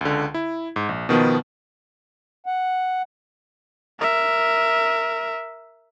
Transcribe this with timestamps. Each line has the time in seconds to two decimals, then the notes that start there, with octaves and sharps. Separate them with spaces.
0.01 C#2 D3
0.34 E4
0.76 G#2
0.89 A#1
1.09 B2 D#3 F3 B3
2.46 F#5
4.00 A#4 E5